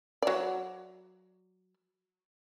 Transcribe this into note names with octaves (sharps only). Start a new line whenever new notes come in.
F#3 D5